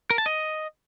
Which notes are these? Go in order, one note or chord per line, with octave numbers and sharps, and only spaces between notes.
A#4
A5
D#5